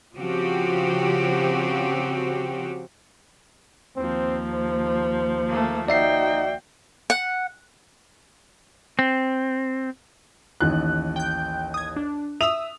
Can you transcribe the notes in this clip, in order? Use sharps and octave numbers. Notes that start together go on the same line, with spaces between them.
C#3 F3 C4 F#4 G4
D#2 F3 C4
C5
A3 A#3
D#4 F#4 D5 E5 G5 C7
F#5
C4
A1 D#2 F#6
G5 G6
D#6 G#6
D4
E5 D#6 E6 F7